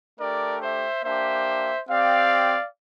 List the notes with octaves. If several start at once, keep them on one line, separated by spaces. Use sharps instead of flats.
A3 D4 G4 A#4 D5
C5 E5
A#3 D4 G4 C5 E5
C4 G4 D5 F5